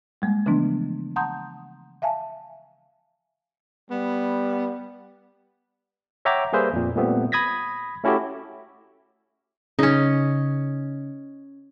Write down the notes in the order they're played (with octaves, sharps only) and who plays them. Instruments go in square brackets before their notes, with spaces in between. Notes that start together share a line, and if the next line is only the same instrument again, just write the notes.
[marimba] G3 G#3 A#3
C#3 E3 F3 A3 B3 D4
F#5 A5 A#5 C6 D#6 G6
E5 F5 G#5 A5
[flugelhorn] G3 [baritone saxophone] B3
[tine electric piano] C#5 E5 F#5 G5 A#5 D6
G3 A#3 G#4 B4 C5 E5
F2 A#2
A#2 G3 A3 B3 C4
B5 D#6 G#6 A#6 B6
A3 C#4 E4 F#4 G4 A4
[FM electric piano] C#3 [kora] C#4 D#4